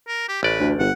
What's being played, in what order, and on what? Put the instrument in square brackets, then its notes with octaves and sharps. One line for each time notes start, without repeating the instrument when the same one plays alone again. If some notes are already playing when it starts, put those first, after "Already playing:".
[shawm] A#4
G4
[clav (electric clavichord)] A1 D5 [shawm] B4
[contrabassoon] D2
[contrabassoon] G1 [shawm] F#5